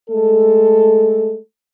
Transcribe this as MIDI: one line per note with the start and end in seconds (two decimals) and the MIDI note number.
0.10 1.38 56
0.10 1.38 57
0.10 1.38 69